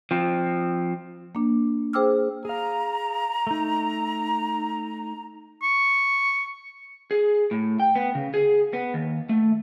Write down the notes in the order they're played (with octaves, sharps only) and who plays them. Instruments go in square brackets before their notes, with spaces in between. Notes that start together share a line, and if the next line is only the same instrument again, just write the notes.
[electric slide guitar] F3 C4
[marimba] A#3 D4
G#4 C5 G5 D6 E6 F6
[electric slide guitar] G#4 F5 [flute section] A#5
[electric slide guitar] A3 D#4
[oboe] C#6
[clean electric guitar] G#4
A2
G5
B3
C#3
G#4
B3
D#2
A3